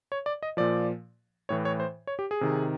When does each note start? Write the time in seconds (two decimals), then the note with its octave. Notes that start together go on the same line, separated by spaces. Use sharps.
0.12 C#5
0.26 D5
0.43 D#5
0.57 A#2 F3 D5
1.49 A2 E3 C#5
1.65 C#5
1.80 C5
2.07 C#5
2.19 G4
2.31 G#4
2.41 C3 D#3